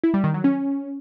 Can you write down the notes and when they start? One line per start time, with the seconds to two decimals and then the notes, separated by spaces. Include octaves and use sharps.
0.04 E4
0.14 G3
0.24 D#3
0.34 F#3
0.44 C#4